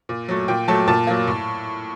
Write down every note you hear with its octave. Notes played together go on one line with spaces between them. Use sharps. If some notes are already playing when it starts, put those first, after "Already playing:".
A#2
F#3 A3
A#2 G5
F#3 A3 A5
A#2 A5
F#3 A#3
A2